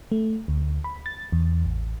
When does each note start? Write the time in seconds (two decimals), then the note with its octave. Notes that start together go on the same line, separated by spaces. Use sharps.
0.12 A3
0.48 D2
0.84 B5
1.06 A6
1.32 E2
1.65 A1